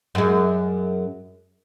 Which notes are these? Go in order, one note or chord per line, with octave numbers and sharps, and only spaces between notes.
F#2 G#3